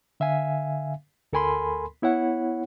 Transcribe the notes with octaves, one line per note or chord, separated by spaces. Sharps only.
D3 E5 F5 G#5
D2 A4 A#4 G#5 B5 C6
B3 E4 C#5 F#5